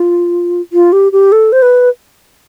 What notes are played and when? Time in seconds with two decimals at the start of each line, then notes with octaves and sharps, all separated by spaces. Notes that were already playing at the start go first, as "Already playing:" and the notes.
Already playing: F4
0.73 F4
0.93 G4
1.12 G4
1.32 A4
1.52 C5
1.62 B4